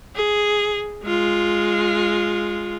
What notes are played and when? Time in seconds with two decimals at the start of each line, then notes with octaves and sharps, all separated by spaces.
0.15 G#4
1.03 G#3 F4